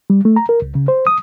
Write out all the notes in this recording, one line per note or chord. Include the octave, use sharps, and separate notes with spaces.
G3
A3
A#5
A#4
C#2
C#3
C5
D#6